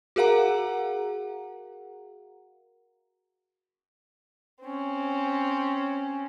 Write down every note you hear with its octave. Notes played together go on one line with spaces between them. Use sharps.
F#4 G#4 A#4 F5 F#5 A#5
C4 C#4